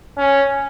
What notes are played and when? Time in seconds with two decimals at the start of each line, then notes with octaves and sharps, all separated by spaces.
0.18 C#4